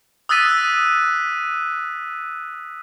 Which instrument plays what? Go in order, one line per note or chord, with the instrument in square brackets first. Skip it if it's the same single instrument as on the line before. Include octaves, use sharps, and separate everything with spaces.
[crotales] D#6 E6 F#6 A6 B6 D#7